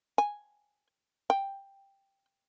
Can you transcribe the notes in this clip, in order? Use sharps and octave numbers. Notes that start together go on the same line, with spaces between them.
G#5
G5